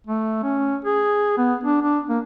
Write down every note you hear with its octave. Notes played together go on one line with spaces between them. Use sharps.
A3
C#4
G#4
B3
D4
D4
A#3